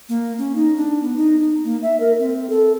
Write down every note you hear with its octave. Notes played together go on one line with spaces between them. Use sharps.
A#3
C#4
D#4
D4
B3
D#4
D#4
A#3
E5
A#4
C4
A4